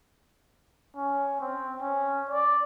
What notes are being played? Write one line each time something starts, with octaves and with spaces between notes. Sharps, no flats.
C#4
C4
C#4
D5